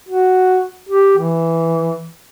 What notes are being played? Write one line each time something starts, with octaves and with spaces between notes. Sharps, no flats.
F#4
G4
E3